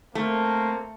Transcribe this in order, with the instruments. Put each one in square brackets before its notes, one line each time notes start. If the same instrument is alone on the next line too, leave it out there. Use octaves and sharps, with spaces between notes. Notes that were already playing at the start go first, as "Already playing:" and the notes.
[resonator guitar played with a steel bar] A3 [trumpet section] A#3 C4 A#4